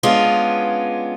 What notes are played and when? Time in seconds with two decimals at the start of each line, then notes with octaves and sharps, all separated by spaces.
0.03 G#3 B3 C#4 D4 F4